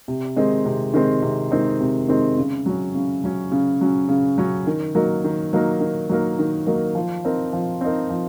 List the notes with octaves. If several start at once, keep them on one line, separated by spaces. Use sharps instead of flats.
C3
D#3 G#3 C4 D#4
C3
D#3 G#3 C4 D#4
C3
D#3 G#3 C4 D#4
C3
D#3 G#3 C4 D#4
C#3
F#3 C#4
C#3
F#3 C#4
C#3
F#3 C#4
C#3
F#3 C#4
D#3
F#3 A#3 D#4 A#4
D#3
F#3 A#3 D#4 A#4
D#3
F#3 A#3 D#4 A#4
D#3
F#3 A#3 D#4 A#4
F3
C4 D#4 A#4
F3
C4 D#4 A#4
F3